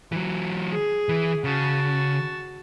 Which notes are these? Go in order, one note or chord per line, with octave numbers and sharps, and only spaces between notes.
E3 F#3
G#4
E3
C#3 F#4 A5